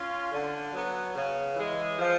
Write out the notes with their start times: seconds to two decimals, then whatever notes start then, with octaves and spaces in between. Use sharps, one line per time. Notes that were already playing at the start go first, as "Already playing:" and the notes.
Already playing: C#4 F4
0.32 D3
0.73 F#3 B3
1.15 C#3
1.56 E3 G#3
1.98 F3